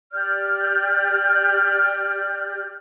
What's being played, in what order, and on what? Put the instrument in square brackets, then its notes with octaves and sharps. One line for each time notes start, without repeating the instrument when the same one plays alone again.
[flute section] G4 D5 F6 G6